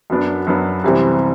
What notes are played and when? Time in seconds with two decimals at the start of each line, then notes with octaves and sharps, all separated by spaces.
0.10 F#2 F#3 B3 D4
0.47 F#2 F#3 B3 D4
0.84 C2 C3 E3 G3 C4